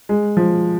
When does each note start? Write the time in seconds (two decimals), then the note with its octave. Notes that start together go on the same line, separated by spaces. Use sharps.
0.09 G#3
0.37 F3